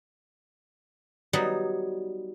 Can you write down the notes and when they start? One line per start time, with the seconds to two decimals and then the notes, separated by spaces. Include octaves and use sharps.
1.33 F#3 G3 B3 D#4